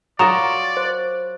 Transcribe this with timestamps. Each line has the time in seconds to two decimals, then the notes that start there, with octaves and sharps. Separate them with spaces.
0.19 F#3 F4 A#4 D5 A#5 C#6 D#6 E7
0.77 C5